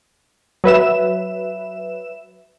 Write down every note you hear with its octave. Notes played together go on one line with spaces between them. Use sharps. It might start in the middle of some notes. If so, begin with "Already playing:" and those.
F#3 B4 E5 E7